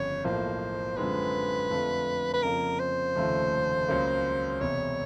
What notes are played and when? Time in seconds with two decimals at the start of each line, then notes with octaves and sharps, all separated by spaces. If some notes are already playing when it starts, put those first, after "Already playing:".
Already playing: G1 F2 C#3 C#5
0.24 B1 A2 F3 A#3 C5
0.97 F#2 D3 F3 G#3 C4 B4
1.71 F2 D3 F3 A3
2.33 B4
2.42 F2 C#3 F3 A#3 A#4
2.79 C5
3.15 F1 D#2 C#3 F3 A3
3.88 C#2 C#3 F#3 A#3
4.61 E1 E2 C3 C#5